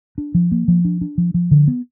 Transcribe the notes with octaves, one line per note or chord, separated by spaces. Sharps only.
D4
F3
A#3
F3
D4
D4
F3
F3
D3
B3